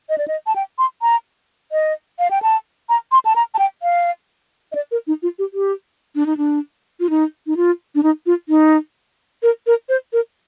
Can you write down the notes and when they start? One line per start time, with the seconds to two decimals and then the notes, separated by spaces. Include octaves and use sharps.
0.09 D#5
0.18 D5
0.28 D#5
0.47 A5
0.56 G5
0.78 C6
1.02 A#5
1.72 D#5
2.19 F5
2.31 G5
2.42 A5
2.89 A#5
3.12 C6
3.25 A5
3.36 A#5
3.54 A5
3.59 G5
3.83 F5
4.72 D#5
4.75 D5
4.91 A#4
5.07 D#4
5.22 F4
5.39 G4
5.53 G4
6.15 D4
6.26 D#4
6.37 D4
7.00 F4
7.10 D#4
7.47 D#4
7.57 F4
7.95 D4
8.03 D#4
8.26 F4
8.49 D#4
9.43 A#4
9.67 A#4
9.89 C5
10.13 A#4